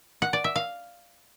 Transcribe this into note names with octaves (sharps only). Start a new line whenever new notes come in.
F#5
D5
E5
F5